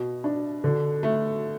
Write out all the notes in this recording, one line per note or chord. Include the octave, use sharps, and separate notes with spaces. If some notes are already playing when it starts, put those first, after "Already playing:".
Already playing: B2
D4
D3
A3